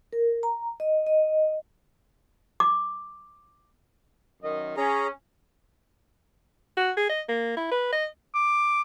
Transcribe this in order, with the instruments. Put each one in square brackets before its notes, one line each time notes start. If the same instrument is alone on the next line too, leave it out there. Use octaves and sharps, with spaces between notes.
[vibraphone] A#4
A#5
D#5
D#5
[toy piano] D6
[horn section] F#2 D#3 D#5
[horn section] C#4 [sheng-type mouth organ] G#4 A#5
[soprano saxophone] F#4
G#4
D#5
A#3
E4
B4
D#5
[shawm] D6